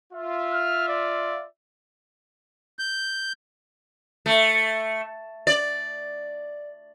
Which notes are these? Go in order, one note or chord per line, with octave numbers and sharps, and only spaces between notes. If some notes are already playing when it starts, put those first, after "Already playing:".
F4 E5
F6
D5
G6
A3
D5